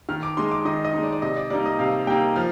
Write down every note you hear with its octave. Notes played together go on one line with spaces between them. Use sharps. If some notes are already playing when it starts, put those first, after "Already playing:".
D#3 F6
D6
G#3 D#4 C6
D6
D#3 D#5
D#5
D#4
G#3 D5
D5
C3 D#5
D5
G3 A#3 D#4 D5
D#5
C3 F5
G3 A#3 D#4 G5
F3 F6